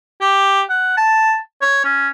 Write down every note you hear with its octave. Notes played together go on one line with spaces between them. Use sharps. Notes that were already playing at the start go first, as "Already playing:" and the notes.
G4
F#5
A5
C#5
C#4